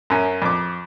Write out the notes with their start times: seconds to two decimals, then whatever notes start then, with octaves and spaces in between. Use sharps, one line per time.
0.10 F#2 C#4
0.42 F2 D6